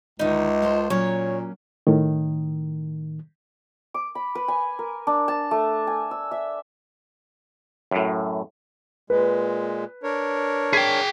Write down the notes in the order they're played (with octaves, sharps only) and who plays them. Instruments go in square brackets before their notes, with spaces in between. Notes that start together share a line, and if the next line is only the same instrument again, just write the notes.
[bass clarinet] C#2 [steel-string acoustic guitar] D3 D#3 [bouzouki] D#4 E5
[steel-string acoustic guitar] F4 A4 C5
[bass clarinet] A#2 [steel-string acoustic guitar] F#3 A#3 C#4 [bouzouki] C#5
[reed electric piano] A2 D#3
[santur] D6
B5
B4
G#5
A#4
D4
A5
A3
G#5
E6
E5
[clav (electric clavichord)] F#2 A2
[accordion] A#2 G#3 [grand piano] B4
[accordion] D4 A#4 C#5
[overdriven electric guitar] G#4 G5 [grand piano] G#6 B6 C7